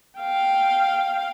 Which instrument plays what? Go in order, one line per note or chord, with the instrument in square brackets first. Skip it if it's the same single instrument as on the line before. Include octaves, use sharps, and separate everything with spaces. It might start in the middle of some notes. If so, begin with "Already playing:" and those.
[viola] F5 G5